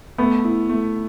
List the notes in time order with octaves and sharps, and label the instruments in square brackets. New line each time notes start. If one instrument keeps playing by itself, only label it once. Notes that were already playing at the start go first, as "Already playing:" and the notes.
[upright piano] A3 [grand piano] B3
[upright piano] E4
A3